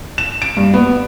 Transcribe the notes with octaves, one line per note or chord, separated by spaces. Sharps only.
E7
D7
G2
B3